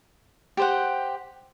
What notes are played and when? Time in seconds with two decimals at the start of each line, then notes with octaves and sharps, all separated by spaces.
0.57 G4 C5 F#5